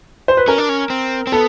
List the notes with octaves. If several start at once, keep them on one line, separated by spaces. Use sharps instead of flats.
C5
B4
C#4 A#4
D4
C#4
C4
C4
B3 A4